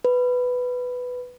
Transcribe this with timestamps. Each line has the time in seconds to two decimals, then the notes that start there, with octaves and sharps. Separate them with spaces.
0.05 B4